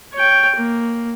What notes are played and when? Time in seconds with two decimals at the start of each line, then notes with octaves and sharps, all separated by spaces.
0.14 C#5 G5
0.56 A#3